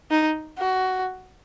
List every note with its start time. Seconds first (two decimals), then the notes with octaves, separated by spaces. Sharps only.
0.11 D#4
0.58 F#4